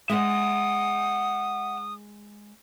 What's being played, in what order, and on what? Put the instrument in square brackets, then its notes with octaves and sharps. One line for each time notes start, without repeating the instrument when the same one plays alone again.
[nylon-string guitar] G#3 G#4 D#5 [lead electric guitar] E5 F#5 [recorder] D#6